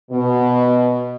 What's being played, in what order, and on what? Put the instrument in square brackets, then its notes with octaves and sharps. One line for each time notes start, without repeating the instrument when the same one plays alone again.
[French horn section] B2